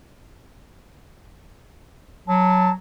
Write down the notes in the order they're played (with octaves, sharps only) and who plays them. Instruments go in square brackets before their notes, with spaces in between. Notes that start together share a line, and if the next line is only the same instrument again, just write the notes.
[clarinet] F#3 [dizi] A5